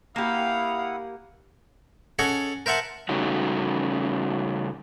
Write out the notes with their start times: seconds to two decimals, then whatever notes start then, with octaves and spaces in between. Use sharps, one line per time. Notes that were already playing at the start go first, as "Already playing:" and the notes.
0.16 A#3 E4 G4 F5 F#5 D#6
2.19 C#4 G#4 A4 D#5 F#5 G#5
2.66 A#4 C5 E5 F#5 A5
3.09 C#3 G3 A3 C#4 D#4 F#4